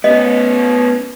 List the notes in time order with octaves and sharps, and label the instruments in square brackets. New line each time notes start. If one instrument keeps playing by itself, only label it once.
[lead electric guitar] B3 C#4 [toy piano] D#5